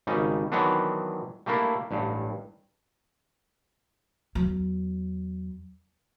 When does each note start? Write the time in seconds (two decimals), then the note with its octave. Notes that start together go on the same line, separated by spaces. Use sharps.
0.07 G#1 C#3 G3 D#4
0.52 D#3 E3 F#3 B3 C4 D4
1.46 G3 A3 A#3 D4 E4
1.91 A1 G2
4.35 E2 F#3